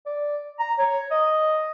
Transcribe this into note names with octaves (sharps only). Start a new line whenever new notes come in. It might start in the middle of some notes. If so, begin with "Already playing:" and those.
D5
A#5
C#5
D#5